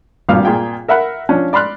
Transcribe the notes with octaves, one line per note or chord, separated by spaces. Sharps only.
G#1 G2 A#2 G3 F5 F6
A#2 F4 G#4 G5
A#4 E5 F#5 B5 F#6
F3 C#4 D4
D5 B5 C6 F6 F#6